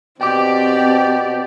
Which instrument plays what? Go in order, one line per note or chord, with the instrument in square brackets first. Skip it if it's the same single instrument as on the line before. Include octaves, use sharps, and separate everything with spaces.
[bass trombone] B2 [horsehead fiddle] C4 [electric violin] G4 D5 [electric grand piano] G5 D6